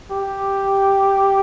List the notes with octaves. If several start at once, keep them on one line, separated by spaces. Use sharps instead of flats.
G4